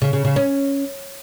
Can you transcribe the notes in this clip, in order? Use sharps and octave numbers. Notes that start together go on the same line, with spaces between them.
C#3
C#3
C#3
C#4